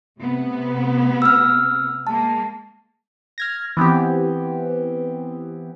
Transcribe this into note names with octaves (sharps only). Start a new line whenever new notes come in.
C3 A3 B3
E6 F6
G#3 A#3 A5
F6 G#6 A#6
E3 B3 C4 G4